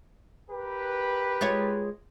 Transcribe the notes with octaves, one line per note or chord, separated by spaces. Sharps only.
G4 A#4 B4
G#3 F4 C#5